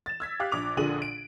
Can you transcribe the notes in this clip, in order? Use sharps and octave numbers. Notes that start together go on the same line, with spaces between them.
A6 E7
E6 G#6 B6
G4 F5 D6 F#6
A#1 D6 F7
A#1 A#2 D3 G#4 D#7 F#7
D7